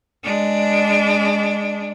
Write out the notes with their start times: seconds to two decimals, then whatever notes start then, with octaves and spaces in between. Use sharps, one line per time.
0.24 G#3 D4